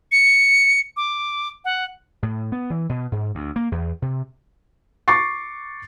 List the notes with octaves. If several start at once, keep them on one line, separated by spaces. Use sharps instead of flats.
C#7
D6
F#5
A2
B3
E3
B2
G#2
D2
A#3
E2
C3
C#6 D6 A6 C7